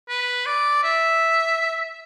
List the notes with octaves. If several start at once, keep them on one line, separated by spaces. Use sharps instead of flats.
B4
D5
E5